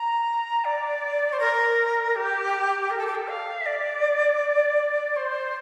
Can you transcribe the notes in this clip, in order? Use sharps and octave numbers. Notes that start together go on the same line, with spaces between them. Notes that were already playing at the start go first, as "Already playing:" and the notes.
Already playing: A#5
D5
C5
A#4
G4
A#4
A4
G4
A4
F5
E5
D5
C5